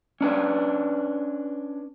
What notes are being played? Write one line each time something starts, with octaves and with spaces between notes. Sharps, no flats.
C#4 D4 B4